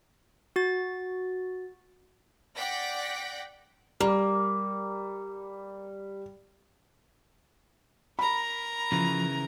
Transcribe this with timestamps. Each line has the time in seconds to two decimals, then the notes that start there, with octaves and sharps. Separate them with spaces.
0.56 F#4 A6
2.57 D5 F#5 G5 A#6 B6 D7
4.00 G3 A#3
8.19 A#4 A#5 B5
8.92 C#3 E3 F3